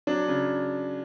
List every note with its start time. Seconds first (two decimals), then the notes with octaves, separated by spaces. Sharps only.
0.07 F#3 D4
0.28 C#3